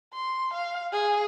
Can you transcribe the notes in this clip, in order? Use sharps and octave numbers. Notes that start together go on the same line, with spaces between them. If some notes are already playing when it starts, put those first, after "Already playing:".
C6
F5
G#4